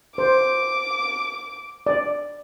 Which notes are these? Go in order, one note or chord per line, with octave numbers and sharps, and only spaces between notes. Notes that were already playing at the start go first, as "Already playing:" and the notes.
C5 D6
D5